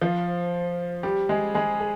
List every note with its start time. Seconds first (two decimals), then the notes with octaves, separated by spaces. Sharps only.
0.01 F3 F4
1.03 G3 G4
1.29 G#3 G#4
1.55 G#3 G#4
1.80 G#4